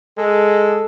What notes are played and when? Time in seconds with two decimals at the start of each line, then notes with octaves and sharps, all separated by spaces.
0.18 G#3 A4